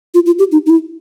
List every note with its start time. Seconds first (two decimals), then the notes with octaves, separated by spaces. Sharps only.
0.14 F4
0.26 F4
0.39 G4
0.52 D#4
0.66 D#4
0.70 E4